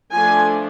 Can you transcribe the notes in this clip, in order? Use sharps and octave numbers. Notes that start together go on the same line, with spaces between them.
F3 A3 D4 G#5